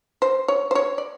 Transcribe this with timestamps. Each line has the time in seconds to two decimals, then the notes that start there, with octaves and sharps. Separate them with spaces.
0.22 C5
0.48 C#5
0.71 C5
0.75 C#5
0.98 D5